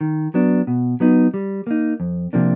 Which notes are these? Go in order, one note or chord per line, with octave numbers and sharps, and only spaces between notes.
D#3
F#3 B3 D4
B2
F#3 B3 D#4
G3
A#3 D#4
F2
C3 F3 A#3 D4